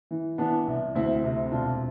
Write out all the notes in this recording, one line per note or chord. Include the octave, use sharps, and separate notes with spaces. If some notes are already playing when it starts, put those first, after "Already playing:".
E3
E3 B3 D4
C2
D2 C4 E4
C3
E1 D4 F4